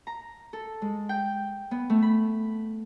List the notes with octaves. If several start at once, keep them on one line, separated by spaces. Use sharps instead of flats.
A#5
A4
G#3
G5
B3
A3
B5